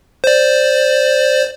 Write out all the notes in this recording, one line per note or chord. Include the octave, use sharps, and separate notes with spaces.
C5 D5